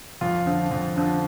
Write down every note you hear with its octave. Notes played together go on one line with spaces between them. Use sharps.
F2 F4
D3 F3
F2
D3 F3